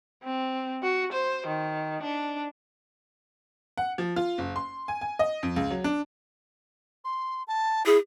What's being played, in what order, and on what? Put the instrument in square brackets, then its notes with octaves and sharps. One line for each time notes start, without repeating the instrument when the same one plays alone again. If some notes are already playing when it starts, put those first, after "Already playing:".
[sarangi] C4
F#4
C5
D#3
D4
[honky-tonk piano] F#5
F3
F4
F#1
C6
G#5
G#5
D#5
F2
C#2
F#3
D4
[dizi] C6
A5
[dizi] E4 [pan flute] G#4